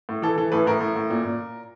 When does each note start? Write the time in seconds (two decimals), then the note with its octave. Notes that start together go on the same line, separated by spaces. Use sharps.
0.09 A2
0.22 E3 A4
0.38 E3 A4
0.52 A2 B4
0.67 A2 A#4
0.81 A2
0.96 A2
1.10 A#2
1.25 A#2